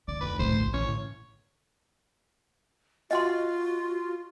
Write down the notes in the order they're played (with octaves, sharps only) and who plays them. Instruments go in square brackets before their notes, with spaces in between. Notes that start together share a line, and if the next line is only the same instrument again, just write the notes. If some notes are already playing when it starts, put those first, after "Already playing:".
[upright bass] D3 [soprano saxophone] D5
[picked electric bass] F1 D2 [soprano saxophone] B4
[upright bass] A2 D3 [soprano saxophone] C5
[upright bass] A#1
[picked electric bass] A2 E3 C#4 [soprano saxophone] C#5
[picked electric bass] A2 D3
[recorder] F4 [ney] F#4 [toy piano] D#5 F#5 C6